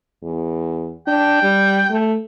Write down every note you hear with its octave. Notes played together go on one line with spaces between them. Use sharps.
E2
D4 G5
G3
A3